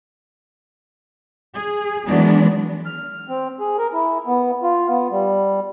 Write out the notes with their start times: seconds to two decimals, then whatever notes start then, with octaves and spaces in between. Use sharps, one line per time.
1.55 G#4
2.07 D#3 E3 F#3 G#3 B3 D4
2.86 F6
3.28 C4
3.60 G#4
3.78 A#4
3.93 E4
4.26 B3
4.63 F4
4.88 B3
5.11 G3